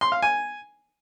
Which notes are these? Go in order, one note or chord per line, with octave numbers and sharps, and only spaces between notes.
C6
F5
G#5